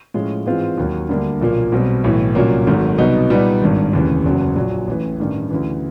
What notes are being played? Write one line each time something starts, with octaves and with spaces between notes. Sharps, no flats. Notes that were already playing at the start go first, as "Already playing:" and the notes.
A2 F3 G#3 C#4 F4
G#2 E3 G#3 C4 F4
D#2 D#3 F#3 A#3
D2 D3 G3 A#3 D4
B1 A#2 F3 A#3
B1 B2 G3 C4
B1 A2 E3
C2 A#2 F#3 A#3 C#4
G#1 G#2 D#3 F#3 A3
C2 B2 F#3 B3 D#4
A#2 G3 B3 D#4
G#1 G2 D#3
F1 D#2 C#3 E3
F#1 E2 C#3 F#3
A#1 A#2 F#3
A1 A2 E3
A1 G2 D#3 G3
D2 C#3 E3